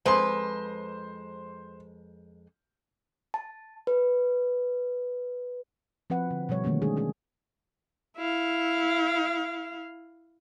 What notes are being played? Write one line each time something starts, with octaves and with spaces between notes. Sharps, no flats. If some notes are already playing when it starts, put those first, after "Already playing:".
F2 G#3 B4 C5 C6
A5
B4
F3 C4 B4 F#5
D3
B2 F3 G3 C#5
D3 D#3 A3 A#3 C#4
G#3 D4 G#4
C#4 G#4
E4 F5